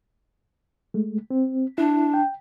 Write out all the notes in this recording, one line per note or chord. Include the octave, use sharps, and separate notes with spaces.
G#3 A3
C4
D4 E4
G5